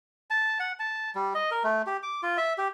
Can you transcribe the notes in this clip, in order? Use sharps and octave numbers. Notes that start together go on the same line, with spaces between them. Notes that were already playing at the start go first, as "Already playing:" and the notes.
A5
F#5
A5
G3
D#5
A#4
A3
G4
D6
F4
E5
G4